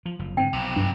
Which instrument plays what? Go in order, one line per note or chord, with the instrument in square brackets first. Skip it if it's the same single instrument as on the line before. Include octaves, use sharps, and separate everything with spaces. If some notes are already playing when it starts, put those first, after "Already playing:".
[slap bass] F3
F#1 F3
[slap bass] G#2 D3 [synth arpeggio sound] C4 [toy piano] G5
[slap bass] B1 [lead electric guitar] F2 C3
[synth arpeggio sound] G2 [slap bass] F#3